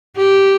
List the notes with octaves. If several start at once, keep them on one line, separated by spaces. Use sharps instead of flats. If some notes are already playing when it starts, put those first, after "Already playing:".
G4